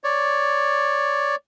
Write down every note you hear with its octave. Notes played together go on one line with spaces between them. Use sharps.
C#5 D5